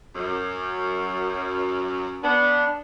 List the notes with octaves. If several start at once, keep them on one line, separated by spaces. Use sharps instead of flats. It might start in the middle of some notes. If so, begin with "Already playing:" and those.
F#2
B3 D4